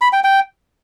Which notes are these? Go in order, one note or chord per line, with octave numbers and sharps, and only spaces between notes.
B5
G5
G5